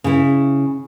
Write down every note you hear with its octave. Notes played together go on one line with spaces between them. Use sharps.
C#3 E4